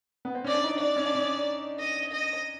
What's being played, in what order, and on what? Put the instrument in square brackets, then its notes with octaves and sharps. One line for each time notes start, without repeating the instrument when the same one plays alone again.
[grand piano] B3
C4
[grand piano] C#4 [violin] D5
[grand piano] D4
D#4
[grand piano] D4 [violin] D5
[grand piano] C#4
D4
C#4
[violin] D#5
D#5